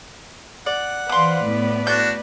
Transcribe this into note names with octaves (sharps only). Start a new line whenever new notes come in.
D5 F#5
E3 B4 C5 D5 F5 C6 D6
A2 B3
D4 F#4 G6